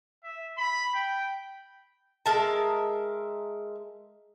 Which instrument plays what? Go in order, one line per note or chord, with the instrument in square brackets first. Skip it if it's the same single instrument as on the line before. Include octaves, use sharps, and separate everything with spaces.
[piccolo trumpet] E5
B5
G5
[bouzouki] G#3 A#4 E5 A5